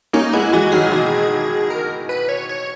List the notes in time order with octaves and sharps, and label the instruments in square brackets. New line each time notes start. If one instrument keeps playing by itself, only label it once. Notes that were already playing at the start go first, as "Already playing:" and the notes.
[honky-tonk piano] A#3 C#4 [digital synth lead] D#4
[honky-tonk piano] G#3 B3 [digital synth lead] E4
[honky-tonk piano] E3 G#3 [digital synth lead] F#4
[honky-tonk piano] D#3 F#3 [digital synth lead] G#4
[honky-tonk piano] B2 D#3
[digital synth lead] A#4
B4
C#5
C#5